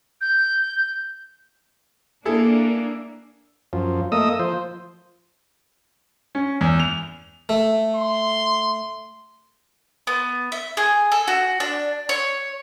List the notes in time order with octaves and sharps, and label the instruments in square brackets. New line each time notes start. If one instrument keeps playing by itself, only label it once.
[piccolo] G6
[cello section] A#3 D4 [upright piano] E4 G#4 A4
[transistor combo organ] F#2 F3
A3 A#3 D#5 D#6 E6
F3 C5
[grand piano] C#4
E2
F7
[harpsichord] A3
[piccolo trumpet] C6
[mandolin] B3
E5
G#4
A4
F#4
D4
C#5